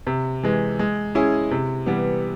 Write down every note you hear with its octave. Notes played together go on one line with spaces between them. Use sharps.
C3
E3 G#3
G#3
C#4 E4 G#4
C3
E3 G3 B3